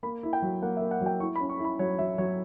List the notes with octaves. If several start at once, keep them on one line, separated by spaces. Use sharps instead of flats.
A#3 B5
E4
G5
F#3
A#3 F#5
E5
A#3
F#5
F#3 G5
E4 C#6
B5
C#4
C#6
E4
B5
F#3 C#5
F#3 E5
F#3 C#5